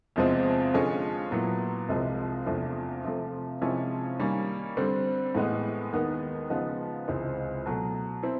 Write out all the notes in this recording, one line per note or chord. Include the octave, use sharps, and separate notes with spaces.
E2 C3 F3 G#3 C4
D3 F3 G#3 C#4
A#2 F#3 B3 E4
C2 C3 F3 G#3
E2 C3 F3 A3 D4
C3 F3 A3
C3 F3 G#3 C#4 E4
D#3 G3 A#3 C#4
D3 G3 C4
A2 E3 G#3 B3
D#2 D#3 G#3 B3
C#3 F3 G#3 B3 D#4
C#2 C3 E3 G#3 C4
B2 F#3 A3
C4 E4